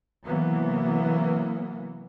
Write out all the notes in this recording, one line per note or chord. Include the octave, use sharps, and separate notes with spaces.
C3 E3 F#3 A#3 B3